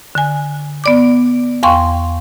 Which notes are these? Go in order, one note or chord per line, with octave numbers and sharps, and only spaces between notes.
D3 G#5
B3 D5 D6
E2 F5 G5 C6 C#6